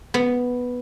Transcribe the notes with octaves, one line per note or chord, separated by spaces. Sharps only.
B3